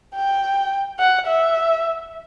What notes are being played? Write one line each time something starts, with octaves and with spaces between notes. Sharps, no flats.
G5
F#5
E5